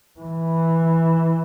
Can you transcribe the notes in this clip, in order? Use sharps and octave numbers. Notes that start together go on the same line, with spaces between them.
E3